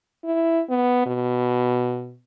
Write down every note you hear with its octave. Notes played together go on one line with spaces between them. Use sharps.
E4
B3
B2